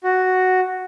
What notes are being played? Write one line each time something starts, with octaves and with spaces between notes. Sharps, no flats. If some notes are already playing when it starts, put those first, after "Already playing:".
F#4